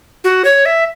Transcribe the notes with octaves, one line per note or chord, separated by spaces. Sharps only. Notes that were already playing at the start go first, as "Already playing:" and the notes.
F#4
C#5
E5